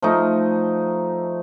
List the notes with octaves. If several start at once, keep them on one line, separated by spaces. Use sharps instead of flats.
F3 A3 D#4